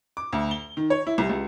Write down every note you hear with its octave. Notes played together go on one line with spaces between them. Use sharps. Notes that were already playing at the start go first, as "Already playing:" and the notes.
D6
D2
G7
D#3
C#5
E4
C2
C#2